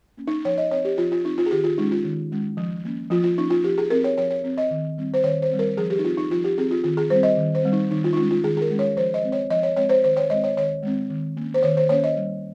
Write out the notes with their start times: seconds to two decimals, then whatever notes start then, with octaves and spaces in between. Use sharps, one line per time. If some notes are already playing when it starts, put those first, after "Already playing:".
0.17 A#3 C#4
0.27 D#4
0.45 F3 C#5
0.58 D#5
0.71 C4 C#5
0.85 G4
0.98 F3 F4
1.12 F4
1.25 C4 D#4
1.38 F4
1.46 G#4
1.51 D#3 G4
1.64 F4
1.78 G#3 C#4 D#4
1.92 F4
2.04 D#3
2.32 G#3 C#4
2.57 F3
2.85 A#3 C#4
3.10 F3 F4
3.24 F4
3.37 A#3 C#4 D#4
3.50 F4
3.64 F3 G4
3.78 G#4
3.90 C4 A#4
4.04 C#5
4.18 F3 C#5
4.31 C#5
4.44 C4
4.58 D#5
4.71 D#3
4.98 G3 C4
5.14 C5
5.23 D#3 C#5
5.42 C5
5.51 G3 C4
5.59 A#4
5.77 F3 G#4
5.90 G4
5.99 D#4
6.04 C4 F4
6.17 D#4
6.31 F3 F4
6.44 G4
6.58 C4 G#4
6.71 F4
6.84 D#3 F4
6.97 G#4
7.10 G3 C4 C5
7.23 D#5
7.37 D#3
7.55 C5
7.63 G3 C4
7.73 D#4
7.91 D#3 D#4
8.04 F4
8.13 D#4
8.17 G#3 C#4 F4
8.31 F4
8.44 D#3 G#4
8.57 G#4
8.61 A#4
8.70 G#3 C#4
8.79 C#5
8.96 F3 C5
9.14 D#5
9.23 G#3 C4
9.32 C#5
9.50 F3 D#5
9.63 C#5
9.77 G#3 C4 C#5
9.89 C5
10.04 D#3 C5
10.17 C#5
10.30 G#3 C4 D#5
10.44 C#5
10.57 D#3 C#5
10.83 G#3 C4
11.10 D#3
11.37 A#3 C#4
11.54 C5
11.63 D#3 C#5
11.77 C5
11.89 A#3 C#4 C#5
12.04 D#5
12.16 G3